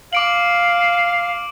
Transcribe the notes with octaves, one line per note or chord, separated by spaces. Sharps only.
F5 D6 D7 F#7